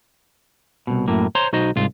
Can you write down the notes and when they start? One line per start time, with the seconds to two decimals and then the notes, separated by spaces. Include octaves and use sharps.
0.87 C2 B2
1.08 F#2 A2 A#3
1.35 C5 C#5 A#5 C6
1.53 B1 D#4 F#4 C5 D#5
1.76 C2 G#2 F4